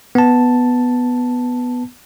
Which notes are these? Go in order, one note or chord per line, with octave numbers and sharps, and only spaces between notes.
B3 A5